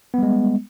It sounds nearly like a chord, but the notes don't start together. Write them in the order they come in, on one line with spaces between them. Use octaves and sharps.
B3 G3 G#3